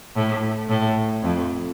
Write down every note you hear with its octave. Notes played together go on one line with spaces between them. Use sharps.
A2
A2
F2